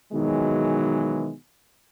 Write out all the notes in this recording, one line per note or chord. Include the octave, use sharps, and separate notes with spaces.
B2 D#3 E3 F#3 G#3